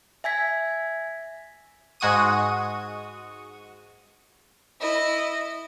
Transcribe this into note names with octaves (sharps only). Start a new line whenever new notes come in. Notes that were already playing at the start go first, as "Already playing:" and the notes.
E5 G#5 G#6 B6
G#2 G#3 F#4 C#6 D#6 D#7
E4 D#5